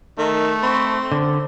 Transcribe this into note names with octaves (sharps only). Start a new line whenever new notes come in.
D#3 A3
C4 B5 C#6
D3 C5